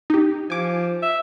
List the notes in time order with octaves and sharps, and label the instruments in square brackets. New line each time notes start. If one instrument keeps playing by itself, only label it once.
[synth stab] D#4 G4
[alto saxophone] F3 [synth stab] G#5 D6
[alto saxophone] E5